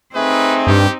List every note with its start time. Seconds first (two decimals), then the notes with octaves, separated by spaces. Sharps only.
0.15 A3 C4 D#4 G#4 B4
0.67 G2 G4